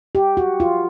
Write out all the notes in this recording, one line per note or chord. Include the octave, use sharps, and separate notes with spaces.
G4
F#4
F4